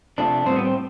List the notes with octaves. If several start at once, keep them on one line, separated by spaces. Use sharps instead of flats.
F2 C3 F3 A3 D4
A2 G3 B3 C4
B3
C4